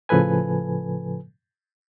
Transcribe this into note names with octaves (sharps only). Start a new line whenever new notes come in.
A2 C#3 F3 A4 B4 G#5